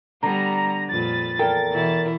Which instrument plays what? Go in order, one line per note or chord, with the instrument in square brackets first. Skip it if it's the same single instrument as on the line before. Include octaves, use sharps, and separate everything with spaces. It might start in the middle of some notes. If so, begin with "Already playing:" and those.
[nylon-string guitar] D3 [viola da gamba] G3 B3 [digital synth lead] A#5
[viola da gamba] F2 A#2 B4 [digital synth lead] A6
[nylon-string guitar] E2 A4 G5 [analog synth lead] A#4
[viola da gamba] B2 E3 E4